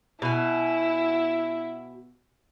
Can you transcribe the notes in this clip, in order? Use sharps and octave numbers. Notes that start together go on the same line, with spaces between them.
B2 E4 G#5